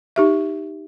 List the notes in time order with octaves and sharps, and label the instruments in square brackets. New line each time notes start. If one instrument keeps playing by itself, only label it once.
[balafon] D#4 G4 E5